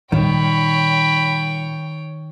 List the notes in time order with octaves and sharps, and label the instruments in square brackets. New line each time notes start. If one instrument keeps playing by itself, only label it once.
[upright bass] A#2 G3 [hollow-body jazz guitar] D#3 [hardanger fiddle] C#5 G5 [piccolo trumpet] B5